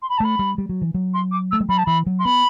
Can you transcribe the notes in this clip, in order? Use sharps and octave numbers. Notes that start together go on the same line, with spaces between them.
C6
B5
A5
A3 B5
G3
G3
F#3
E3
F#3
C6
D6
A3 E6
G3
F#3 B5
A5
E3 B5
F#3
C6
B3 B5